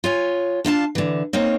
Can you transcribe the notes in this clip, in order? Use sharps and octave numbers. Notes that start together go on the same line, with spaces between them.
F4 C#5 G#5
D4 F4 F5 A5
D3 E3
A#3 C4 C#4 D#4 C#5